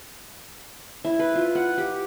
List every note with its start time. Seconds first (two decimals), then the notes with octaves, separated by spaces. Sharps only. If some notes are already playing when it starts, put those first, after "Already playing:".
1.05 E4
1.19 B4
1.35 F4
1.55 F#5
1.78 G4